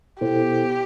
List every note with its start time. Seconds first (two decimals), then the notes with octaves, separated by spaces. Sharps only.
0.21 B2 B3 E4 G4 A4 C5